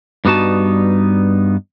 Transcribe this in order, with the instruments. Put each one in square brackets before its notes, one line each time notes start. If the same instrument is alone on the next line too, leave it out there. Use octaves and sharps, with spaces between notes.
[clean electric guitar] G2 G3 B3 D#4 F#4 A5